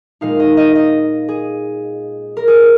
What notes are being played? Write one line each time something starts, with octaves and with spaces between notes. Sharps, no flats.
A#2 G#3 D#4 F5
D#5
D#5
D#5
G#4
A#4
G#4